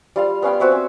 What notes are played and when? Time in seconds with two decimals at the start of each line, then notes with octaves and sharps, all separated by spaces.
0.16 G3 F4 F5
0.42 B3 C#4 F5 G5
0.60 C4 F#4 E5 D6
0.72 C#4